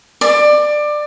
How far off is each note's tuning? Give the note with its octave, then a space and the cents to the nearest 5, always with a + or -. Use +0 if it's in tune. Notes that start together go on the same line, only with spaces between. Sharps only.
D5 +20